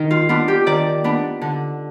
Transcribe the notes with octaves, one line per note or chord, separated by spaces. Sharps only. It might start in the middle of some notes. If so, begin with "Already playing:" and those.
Already playing: D#3 D#4
F4
B3 D4 F4
G4
D#3 D5
B3 D4
D3